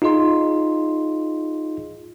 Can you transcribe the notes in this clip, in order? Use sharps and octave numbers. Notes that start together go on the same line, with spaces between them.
D#4 F4 G#4 D#5 C6